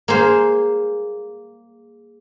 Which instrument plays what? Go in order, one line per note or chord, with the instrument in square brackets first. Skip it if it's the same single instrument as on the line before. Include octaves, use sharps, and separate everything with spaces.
[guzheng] A#3 G#4 C5